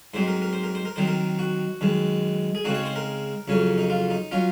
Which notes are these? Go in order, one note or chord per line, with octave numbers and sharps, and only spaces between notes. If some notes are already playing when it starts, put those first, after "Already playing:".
G#2 F#3 C4 D#4 C5
A#4
A#4
C5
A#4
C5
A#4
D#3 F#3 C4 D#4 C5
A#4
F#4
F#2 D#3 G#3
G#4
C#3 G#3 C4 D#4 F#4
C#5
C5
A#4
F2 C#3 F#3 C#4
D#4
F4
D#4
F#3 C#4 F4